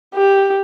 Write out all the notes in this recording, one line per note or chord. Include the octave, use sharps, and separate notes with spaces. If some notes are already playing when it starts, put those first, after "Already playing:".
G4